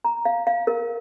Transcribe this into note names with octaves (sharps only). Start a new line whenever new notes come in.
A#5
F5
F5
A#4